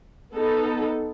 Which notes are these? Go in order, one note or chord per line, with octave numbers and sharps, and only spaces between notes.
B3 D#4 A4